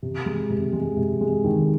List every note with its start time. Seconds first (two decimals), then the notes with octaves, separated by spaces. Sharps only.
0.03 C3
0.26 G#3
0.50 C3
0.73 G#3
0.97 C3
1.21 G#3
1.44 D#3